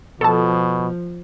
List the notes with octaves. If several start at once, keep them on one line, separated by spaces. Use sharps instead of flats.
B2 F3 A4 A5